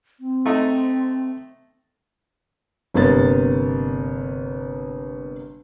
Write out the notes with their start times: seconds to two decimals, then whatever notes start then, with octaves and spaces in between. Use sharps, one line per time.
0.20 C4
0.46 A3 D#4
2.94 G1 C3 A#3 B3 A6